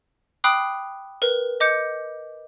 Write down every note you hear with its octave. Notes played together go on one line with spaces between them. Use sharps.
G5 B5 D6 D#6 F#6 C7
A#4 B4
D#5 D6 G6 C#7